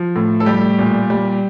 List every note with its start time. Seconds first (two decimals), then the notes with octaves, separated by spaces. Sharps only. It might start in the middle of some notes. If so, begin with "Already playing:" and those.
Already playing: F3
0.16 A2
0.40 A4
0.46 G3 G4
0.79 A#2
1.10 G3